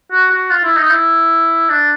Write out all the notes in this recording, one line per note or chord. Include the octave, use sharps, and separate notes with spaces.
F#4
F#4
F4
E4
D#4
E4
D4